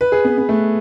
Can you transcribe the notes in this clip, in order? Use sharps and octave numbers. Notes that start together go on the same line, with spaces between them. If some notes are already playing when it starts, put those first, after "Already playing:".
B4
G#4
B3
B3
A3